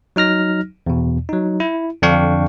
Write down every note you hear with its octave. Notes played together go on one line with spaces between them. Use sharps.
F#3 D#4 F6 A#6
E2 B2
F#3 D#4
E4
F2 D3 D4 F5 G5 C#6